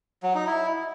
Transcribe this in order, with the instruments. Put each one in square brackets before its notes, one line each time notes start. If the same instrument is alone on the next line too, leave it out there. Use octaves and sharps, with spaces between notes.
[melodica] F#3
D#4
E4